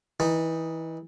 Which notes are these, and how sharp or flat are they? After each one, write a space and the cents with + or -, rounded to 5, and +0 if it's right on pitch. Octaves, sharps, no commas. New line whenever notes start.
E3 -20 D#4 +0